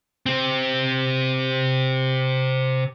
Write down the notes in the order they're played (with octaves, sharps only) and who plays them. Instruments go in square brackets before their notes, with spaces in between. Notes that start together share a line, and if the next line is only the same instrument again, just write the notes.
[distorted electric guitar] C3 C4